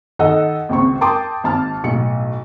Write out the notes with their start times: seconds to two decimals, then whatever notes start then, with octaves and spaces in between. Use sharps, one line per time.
0.19 D#3 A4 D#5 F#5 E6
0.69 G#1 C#2 C4 C#6
1.01 A#4 G5 A5 C6 D6 D#6
1.44 G#1 A5 F6
1.84 B1 A2 C#7